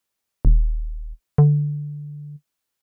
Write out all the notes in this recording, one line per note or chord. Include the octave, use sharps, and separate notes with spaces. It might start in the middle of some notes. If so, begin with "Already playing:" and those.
D#1
D3